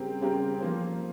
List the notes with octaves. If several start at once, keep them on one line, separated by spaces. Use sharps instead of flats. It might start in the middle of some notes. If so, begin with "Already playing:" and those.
Already playing: C#3 G3 C4 G4 A#4
C#3 G3 C4 G4 A#4
F3 A#3 F4 C5